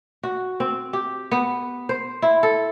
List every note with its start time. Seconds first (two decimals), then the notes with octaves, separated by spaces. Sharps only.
0.23 F#4
0.60 C4
0.93 G4
1.31 B3
1.89 C5
2.22 E4
2.43 A4